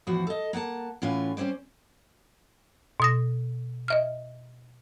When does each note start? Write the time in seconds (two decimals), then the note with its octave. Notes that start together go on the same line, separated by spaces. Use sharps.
0.07 E2 A2 F3 F#4 F#5
0.27 A4 D#5
0.53 A#3 F#5 G#5 A5
1.02 A2 E3 C#4 F4 F#5 G#5
1.37 G3 C4 C#4 C5 D5
3.00 B2 D#6 A#6
3.88 D#5 E5 F6